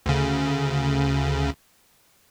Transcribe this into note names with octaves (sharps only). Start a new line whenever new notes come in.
D2 C#3